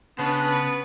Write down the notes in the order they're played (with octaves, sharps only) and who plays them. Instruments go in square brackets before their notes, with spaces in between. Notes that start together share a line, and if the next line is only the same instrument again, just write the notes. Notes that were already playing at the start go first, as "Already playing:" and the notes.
[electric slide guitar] C#3 [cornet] B3 [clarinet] D4 [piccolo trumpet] B4